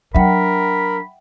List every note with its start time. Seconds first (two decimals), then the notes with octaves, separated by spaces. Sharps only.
0.15 F#3 D4 A#4 E5 F#5 G5 B5